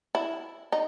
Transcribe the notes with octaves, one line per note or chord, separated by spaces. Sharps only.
E4
D#4